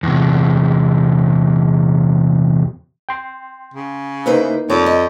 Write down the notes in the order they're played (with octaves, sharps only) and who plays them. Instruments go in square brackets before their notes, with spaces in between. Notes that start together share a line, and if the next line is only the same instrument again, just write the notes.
[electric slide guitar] E2 C3
[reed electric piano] G5 C6
[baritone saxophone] C#3
[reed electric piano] A#3 D#4 [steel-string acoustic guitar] E4 B4 C5
[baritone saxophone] F2 [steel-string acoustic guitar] C#5 D5
[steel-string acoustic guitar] D#5